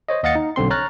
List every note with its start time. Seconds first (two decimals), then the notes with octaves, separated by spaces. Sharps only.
0.09 C5 C#5 D#5
0.23 D#2 D#5 F5 F#5 A6 C#7
0.35 D#4
0.56 B1 D3 C4 C6
0.70 C#5 A#5 C#6 F6 F#6 A6